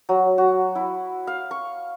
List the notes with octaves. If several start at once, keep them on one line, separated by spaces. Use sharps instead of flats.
F#3
F#4
E4
F5
C#6